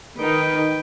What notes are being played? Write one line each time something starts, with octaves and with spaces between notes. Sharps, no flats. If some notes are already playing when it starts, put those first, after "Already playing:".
D#3 D#4 B4 G5